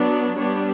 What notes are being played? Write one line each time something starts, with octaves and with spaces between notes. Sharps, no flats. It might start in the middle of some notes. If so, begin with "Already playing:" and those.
Already playing: F#3 B3 D4
G3 B3 D4 C#5